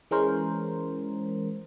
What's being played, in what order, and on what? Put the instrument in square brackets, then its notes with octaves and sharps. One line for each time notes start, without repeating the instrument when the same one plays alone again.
[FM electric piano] E3 G#3 C#4 A#4 C5